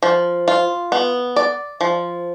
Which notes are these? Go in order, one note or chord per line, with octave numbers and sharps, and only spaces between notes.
F3
F4
B3
D5
F3